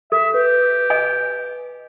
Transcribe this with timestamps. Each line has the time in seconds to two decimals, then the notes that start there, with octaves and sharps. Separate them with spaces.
0.12 A4 E5
0.34 G4 B4
0.90 D#5 G#5